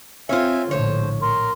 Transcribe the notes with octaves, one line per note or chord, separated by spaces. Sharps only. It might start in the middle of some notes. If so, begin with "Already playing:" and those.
C4 F4 C#5 E5 F5 G#5
A#1 A2 D3 C5 C#5
A#4 C6